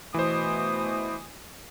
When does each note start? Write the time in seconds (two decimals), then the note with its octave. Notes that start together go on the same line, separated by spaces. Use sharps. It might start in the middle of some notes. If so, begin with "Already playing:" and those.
0.14 B2 E3 A3 C5 D#6